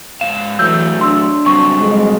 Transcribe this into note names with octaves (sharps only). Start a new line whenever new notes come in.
G#2 F5 E7
E3 F#3 A3 E6 G6
D4 C6 E6
F#3 G3 C4 C#6
F2 B2 G#3